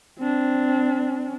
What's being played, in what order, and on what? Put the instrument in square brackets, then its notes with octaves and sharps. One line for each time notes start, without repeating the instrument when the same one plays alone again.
[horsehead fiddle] C4 D4